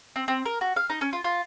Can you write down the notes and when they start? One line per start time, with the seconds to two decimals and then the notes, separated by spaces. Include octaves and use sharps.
0.16 C4
0.28 C4
0.45 A#4
0.61 F#4
0.76 F5
0.90 D#4
1.01 C#4
1.13 F4
1.24 F4